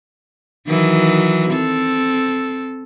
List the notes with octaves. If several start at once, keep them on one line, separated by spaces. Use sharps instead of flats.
D#3 E3 F#3
C4 A4